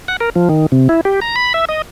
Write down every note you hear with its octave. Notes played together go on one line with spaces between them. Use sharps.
F#5
A#4
F3
D#3
C3
E4
G4
A#5
B5
E5
D#5